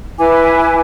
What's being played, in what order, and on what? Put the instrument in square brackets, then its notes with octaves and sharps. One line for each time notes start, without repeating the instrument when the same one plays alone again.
[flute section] E4 B4 G#5 D6